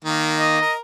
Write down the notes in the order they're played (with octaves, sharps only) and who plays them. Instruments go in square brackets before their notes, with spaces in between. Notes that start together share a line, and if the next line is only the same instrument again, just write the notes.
[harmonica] D#3 A#3
[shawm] D#5
[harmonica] A#4